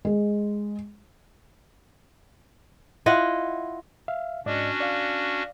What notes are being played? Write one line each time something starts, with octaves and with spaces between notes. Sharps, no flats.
G#3
E4 F4 D#5 F#5
E5 F5
G#2 C#4 D4 F#4 D5 D#5
D5 F5